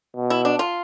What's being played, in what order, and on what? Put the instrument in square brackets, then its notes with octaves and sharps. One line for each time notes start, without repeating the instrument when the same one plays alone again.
[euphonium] B2
[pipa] E4
D4
F4